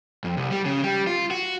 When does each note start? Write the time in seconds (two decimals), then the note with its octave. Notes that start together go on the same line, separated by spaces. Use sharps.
0.24 F2
0.37 C2
0.51 G3
0.65 C#3
0.84 G3
1.07 F4
1.31 F#4